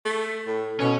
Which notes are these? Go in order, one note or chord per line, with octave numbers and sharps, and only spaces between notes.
A3 B6
A2 A4
B2 E3 C#4